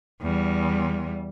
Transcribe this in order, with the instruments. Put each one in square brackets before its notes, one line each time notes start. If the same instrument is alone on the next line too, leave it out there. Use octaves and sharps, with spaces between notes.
[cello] E2 G3